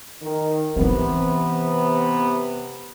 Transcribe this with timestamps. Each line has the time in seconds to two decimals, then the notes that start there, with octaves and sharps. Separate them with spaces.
0.21 D#3
0.76 C3 E3 B3 C4